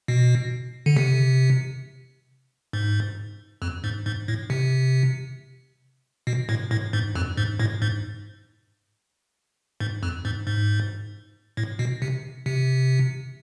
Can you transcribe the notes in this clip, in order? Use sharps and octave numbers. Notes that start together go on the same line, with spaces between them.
B2
D3
C3
G#2
F2
G#2
G#2
A2
C3
B2
A2
A2
G#2
F2
G#2
A2
G#2
G#2
F2
G#2
G#2
A2
B2
C3
C3